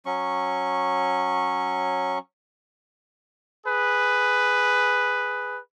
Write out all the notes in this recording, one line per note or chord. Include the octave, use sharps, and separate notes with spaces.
F#3 C#4 C#6
G#4 B4